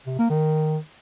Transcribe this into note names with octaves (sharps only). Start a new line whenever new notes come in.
C3
A#3
D#3